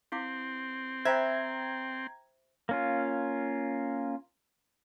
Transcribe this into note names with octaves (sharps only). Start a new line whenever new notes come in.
C4 E4 F5 D6
C5 E5 G5 A#5 B5 G#6
A#3 C#4 F4